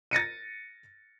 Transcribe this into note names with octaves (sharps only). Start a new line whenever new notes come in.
A6 A#6 C#7 D#7